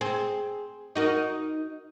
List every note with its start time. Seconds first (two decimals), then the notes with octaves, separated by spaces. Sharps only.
0.01 C4 G#4
0.95 D#4 F#4 A#4